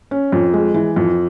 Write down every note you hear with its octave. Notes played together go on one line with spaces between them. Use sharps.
C#4
F2
G#3
E3
F2